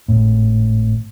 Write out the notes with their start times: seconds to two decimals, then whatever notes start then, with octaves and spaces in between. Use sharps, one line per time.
0.08 G#1 A2